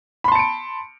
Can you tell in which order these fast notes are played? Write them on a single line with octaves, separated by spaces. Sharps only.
B5 C6 A5 C#7 D7